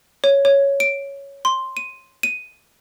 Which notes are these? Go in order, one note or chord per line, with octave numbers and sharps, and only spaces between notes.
C#5
C#5
D7
C6
D#7
D#7